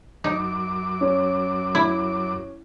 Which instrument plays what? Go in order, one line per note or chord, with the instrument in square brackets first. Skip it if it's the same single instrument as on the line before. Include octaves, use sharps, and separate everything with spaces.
[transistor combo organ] F#2 D6 [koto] D#4
[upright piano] C#4
[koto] E4